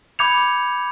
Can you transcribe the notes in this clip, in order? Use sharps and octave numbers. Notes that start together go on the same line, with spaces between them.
B5 D6 G6 G#6 C#7 F7